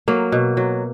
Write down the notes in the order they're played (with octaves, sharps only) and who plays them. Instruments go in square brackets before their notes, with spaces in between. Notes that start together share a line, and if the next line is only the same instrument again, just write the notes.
[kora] F#3 A#3
B2
F#3